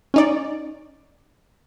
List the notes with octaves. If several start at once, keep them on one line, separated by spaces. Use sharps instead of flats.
C#4 D#4 D5